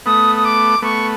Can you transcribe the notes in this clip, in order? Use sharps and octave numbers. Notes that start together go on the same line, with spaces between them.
A3 B3 D#6
D#6
D6
A3 B3 C#6